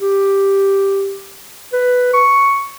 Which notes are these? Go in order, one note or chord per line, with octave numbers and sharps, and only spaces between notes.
G4
B4
C#6